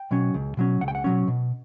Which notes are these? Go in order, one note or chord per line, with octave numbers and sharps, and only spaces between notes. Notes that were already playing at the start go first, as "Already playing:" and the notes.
Already playing: G5
B2 F#3 C#4
C#2
B2 F#3 C#4
C#2 F#5
G5
F#5
B2 F#3 C#4
B2